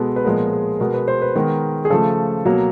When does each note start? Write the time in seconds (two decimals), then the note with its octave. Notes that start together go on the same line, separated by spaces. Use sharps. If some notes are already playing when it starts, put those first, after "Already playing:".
Already playing: B2 G#3 B3 A4
0.16 B4
0.25 A#2 F3 G#3 B3 A#4
0.53 G#4
0.80 B2 G#3 B3 A#4
0.94 B4
1.08 C5
1.22 B4
1.35 D#3 G#3 B3 A#4
1.85 G#4
1.90 C#3 F3 A3 A4
2.45 B2 F#3 A#3